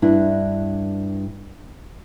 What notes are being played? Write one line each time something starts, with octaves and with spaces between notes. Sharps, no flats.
G2 D4 E4